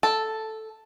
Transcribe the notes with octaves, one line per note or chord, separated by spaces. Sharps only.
A4